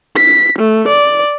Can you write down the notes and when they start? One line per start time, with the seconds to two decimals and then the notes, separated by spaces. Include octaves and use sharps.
0.16 B6
0.59 A3
0.88 D5